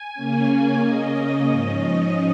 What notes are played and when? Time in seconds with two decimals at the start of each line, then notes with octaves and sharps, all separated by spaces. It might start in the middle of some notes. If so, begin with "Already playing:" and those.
Already playing: G#5
0.14 C#3 A#3 C#4
0.82 C#3 A#3 C#4 D#5
1.49 G#2 F3 C#4